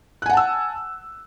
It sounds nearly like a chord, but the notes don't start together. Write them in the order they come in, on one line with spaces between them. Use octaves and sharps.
F#6 G#5 F#5 A5 E6